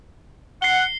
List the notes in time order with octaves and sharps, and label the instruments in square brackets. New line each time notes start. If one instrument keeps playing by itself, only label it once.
[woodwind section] F#5 [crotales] C7 G7